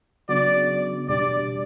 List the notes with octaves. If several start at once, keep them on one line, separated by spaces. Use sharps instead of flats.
C#3 F#3 B3 D4 F#4 D5
E2 B2 G3 D4 G4 D5